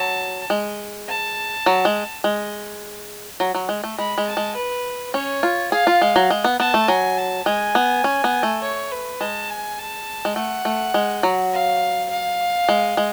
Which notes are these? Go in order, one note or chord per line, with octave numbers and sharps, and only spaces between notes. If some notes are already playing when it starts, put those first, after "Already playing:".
Already playing: F#3 A5
G#3
A5
F#3
G#3
G#3
F#3
F#3
G#3
A3
G#3 B5
G#3
A5
G#3
B4
C#4 C#5
F4
G#4 F5
F4
G#3
F#3
G#3
B3
B3 A5
A3
F#3 G#5
A5
G#3 G#5
B3
C#4
B3
A3
C#5
B4
G#3 A5
G#5
A5
G#3
A3 F#5
A3
G#3
F#3
F5
F5
G#3
G#3